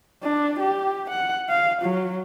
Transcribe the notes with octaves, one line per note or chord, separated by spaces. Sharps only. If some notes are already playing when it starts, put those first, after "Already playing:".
D4
G4
F#5
F5
F#3